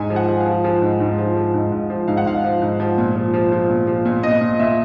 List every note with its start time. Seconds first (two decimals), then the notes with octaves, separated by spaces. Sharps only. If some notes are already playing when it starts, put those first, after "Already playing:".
Already playing: G#2 G#5
0.10 F3
0.16 F#5
0.28 F3
0.40 F5
0.46 F3
0.64 F3
0.82 G#2
1.00 G#2
1.18 F3
1.36 F3
1.54 G#2
1.72 G#2
1.90 F3
2.08 G#2 F5
2.17 F#5
2.26 G#2 F5
2.44 F3
2.62 G#2
2.80 F3
2.98 A#2
3.16 F3
3.34 F3
3.52 F3
3.70 A#2
3.87 F3
4.05 A#2
4.23 A#2 D#5
4.41 A#2
4.59 A#2 E5